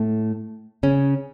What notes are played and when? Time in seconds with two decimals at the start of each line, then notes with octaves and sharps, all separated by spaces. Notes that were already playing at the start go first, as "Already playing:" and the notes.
Already playing: A2 A3
0.83 C#3 C#4